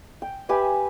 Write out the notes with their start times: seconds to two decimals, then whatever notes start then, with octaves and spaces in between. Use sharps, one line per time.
0.22 G5
0.49 G4 B4 E5 G#5